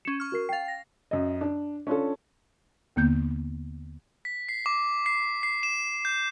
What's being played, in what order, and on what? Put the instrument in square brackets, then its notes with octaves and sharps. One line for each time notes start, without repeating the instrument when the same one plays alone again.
[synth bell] C#4 E7 [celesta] C#7
[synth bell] C#6 F6
[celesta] F#4 A#4 C7
[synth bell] F5 C7 [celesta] G5 A6
[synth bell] A#6
[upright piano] F#2 D#5
D4
C#4 D4 F4 A4
[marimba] D#2 D3 A#3 B3 G6
[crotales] B6
C7
D6
C7
C7
E7
G6